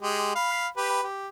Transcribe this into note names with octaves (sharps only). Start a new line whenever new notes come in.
G#3 G4
F5 B5
G4 B4
G4